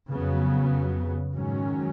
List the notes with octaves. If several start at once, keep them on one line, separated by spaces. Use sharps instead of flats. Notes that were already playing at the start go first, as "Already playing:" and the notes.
F2 C#3 F#3 B3
G#2 D#3 F#3 C#4